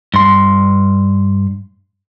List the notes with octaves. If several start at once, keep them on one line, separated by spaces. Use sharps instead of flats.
G2 C6